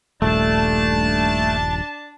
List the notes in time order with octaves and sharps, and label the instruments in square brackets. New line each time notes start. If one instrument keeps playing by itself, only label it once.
[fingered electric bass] D#1 A#1 G2 [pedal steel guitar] A3 [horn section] D4 A5